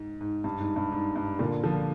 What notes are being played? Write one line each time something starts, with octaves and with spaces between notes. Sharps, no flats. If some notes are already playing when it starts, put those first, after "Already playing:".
Already playing: G#2
G#2
G2
G#2
G2
G#2
G2
A#2 D3
D3 F3